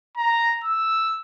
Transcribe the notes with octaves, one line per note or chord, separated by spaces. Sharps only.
A#5
E6